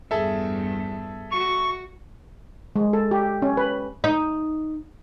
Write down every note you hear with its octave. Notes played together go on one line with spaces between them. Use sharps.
E2 G2 G#4 A4 E5
F#4 C#6
G#3
A4
G4
C#4
B4
D#4